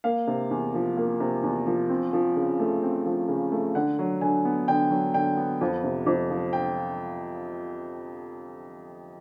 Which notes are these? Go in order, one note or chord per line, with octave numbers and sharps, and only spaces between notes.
A#3 F5
C3
E2
F3
A#3
C3
E2
F3
C4
F3
C#3
A3
C4
F3
C#3
A3
D3 F#5
F#3
D3 G#5
B3
D3 G5
F#3
D3 G5
B3
F2
C3
F2
F3
G5